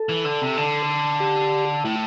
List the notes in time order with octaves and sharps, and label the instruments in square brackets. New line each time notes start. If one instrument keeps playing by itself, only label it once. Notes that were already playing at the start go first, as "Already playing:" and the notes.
Already playing: [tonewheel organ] A4
[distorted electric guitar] E3
D3
C3
D3
[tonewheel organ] G4
[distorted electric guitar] A2 [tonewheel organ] E4